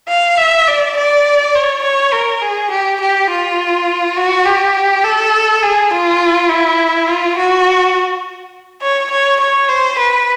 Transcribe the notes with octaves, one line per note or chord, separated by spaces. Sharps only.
F5
E5
D5
D5
C#5
C#5
A#4
G#4
G4
G4
F4
F#4
G4
A4
G#4
F4
E4
F4
F#4
C#5
C#5
C#5
C5
B4